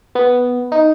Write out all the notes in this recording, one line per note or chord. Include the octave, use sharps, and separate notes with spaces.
B3
D#4